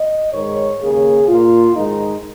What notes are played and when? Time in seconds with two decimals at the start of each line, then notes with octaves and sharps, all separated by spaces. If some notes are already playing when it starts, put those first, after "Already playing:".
Already playing: D#5
0.32 G#2 D#3 G#3 C#5
0.80 D#2 C#3 A#3 G#4
1.28 A#2 A#3 F4
1.75 G#2 D#3 G#3 D#4